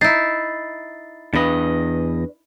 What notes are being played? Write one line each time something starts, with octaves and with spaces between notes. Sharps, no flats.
D#4 E4 A6 C7
E2 D4 B4 D#5